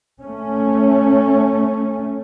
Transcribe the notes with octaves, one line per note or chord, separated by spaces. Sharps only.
A3 C#4